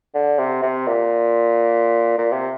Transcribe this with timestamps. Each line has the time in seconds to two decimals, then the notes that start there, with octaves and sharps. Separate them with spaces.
0.14 D3
0.39 C3
0.62 C3
0.87 A#2
2.18 A#2
2.32 C3